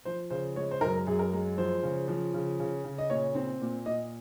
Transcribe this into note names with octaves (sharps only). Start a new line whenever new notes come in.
F3 C5
C#3 C5
G#3 C#5
C5
F#2 A#4
F#2 G#4
A#4
G#3
F3 C5
C#3
F3
C#3
C#3
C#3
D#5
A#2 C#5
C4
A#2
A#2 D#5